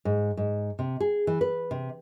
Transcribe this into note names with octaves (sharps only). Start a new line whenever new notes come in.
G#2
G#2
C3
G#4
E3
B4
C3